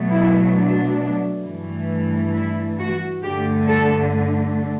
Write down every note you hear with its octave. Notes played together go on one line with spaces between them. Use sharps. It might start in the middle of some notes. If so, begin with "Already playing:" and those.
Already playing: B2 F#3 A3
E4
D4
G2 E3 A3
E4
F#4
G2 D3 A3 G4
A4